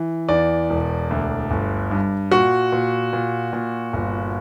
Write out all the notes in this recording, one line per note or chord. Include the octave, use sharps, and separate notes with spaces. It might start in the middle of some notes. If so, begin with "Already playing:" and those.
Already playing: E3
E2 D5
E1
D2
G1
G2
A#2 F#4
A#2
A#2
A#2
G1